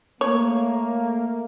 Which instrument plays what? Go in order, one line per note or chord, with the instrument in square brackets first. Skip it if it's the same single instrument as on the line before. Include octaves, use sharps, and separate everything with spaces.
[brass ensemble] A3 A#3 [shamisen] C#5